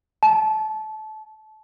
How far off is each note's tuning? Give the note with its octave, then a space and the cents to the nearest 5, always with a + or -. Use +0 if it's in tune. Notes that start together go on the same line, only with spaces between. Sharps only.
A5 -25